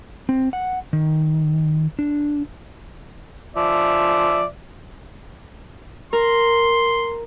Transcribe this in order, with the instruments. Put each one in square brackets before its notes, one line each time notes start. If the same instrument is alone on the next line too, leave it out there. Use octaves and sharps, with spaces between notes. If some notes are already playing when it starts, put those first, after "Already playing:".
[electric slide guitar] C4
F#5
D#3
D4
[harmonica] F3 D5 E5
[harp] A#4 [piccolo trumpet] C6